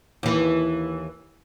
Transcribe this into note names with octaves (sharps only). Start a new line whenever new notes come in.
D#2 E3